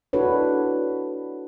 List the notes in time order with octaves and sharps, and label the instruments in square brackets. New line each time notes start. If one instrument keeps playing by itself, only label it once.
[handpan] D4 E4 F#4 A4 B4 C#5